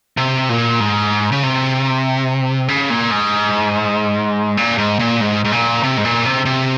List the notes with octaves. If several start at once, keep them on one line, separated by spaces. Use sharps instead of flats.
C3
A#2
G#2
C#3
C3
C#3
A#2
G#2
A#2
G#2
A#2
G#2
G#2
A#2
C3
G#2
A#2
C3
C3